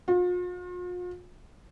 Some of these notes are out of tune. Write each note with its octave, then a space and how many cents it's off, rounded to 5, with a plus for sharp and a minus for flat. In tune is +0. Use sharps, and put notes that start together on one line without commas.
F4 +40